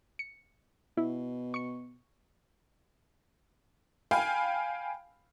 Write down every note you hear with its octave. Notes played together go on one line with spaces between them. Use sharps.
C#7
B2 E4
C#6 C#7
F5 G5 G#5 B5